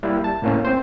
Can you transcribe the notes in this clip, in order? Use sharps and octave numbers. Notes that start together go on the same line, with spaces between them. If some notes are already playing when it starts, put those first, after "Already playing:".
G3 A#3 E4
A5
A2 A#3 C#4
C4 C5